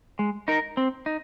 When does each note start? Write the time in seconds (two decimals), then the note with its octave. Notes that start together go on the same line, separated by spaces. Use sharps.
0.19 G#3
0.48 D#4 A#4
0.77 C4
1.06 D#4